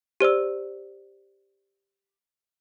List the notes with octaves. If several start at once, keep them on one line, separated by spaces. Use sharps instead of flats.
G4 C5 D5 E6